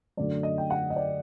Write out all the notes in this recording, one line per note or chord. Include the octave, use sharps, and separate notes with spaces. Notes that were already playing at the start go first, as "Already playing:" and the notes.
F#2 D3 A3 D4 D5
D#5
G5
F#5
D#5
D5